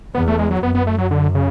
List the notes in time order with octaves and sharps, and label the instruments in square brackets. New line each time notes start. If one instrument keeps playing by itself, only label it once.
[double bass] E2 [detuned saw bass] B3
[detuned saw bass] A3
G#3
F#3
[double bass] F#2 [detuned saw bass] B3
[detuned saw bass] B3
A3
F#3
D3
C#3